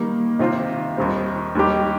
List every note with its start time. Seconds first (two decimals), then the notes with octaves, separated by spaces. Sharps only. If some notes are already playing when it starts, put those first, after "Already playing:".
Already playing: D#3 G3 A#3
0.39 C3 D#3 C4 F4 C5
0.97 D#2 D#3 G3 C4
1.55 D#2 D#3 G3 D#4 G4